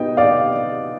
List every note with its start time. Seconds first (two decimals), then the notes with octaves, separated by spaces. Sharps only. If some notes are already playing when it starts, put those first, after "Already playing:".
Already playing: B3 D#4 D#5 G5
0.17 D5 F5